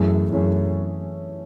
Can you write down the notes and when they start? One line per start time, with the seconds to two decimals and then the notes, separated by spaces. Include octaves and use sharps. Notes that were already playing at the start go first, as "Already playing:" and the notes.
Already playing: F#2 E3 A3 C#4 G#4
0.32 F#2 E3 A3 C#4 G#4